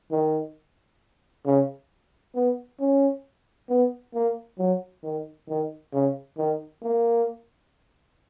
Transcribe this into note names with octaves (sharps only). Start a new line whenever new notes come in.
D#3
C#3
B3
C#4
B3
A#3
F#3
D#3
D#3
C#3
D#3
A#3